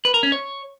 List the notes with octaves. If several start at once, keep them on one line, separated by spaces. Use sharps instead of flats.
B4
A#4
C#4
C#5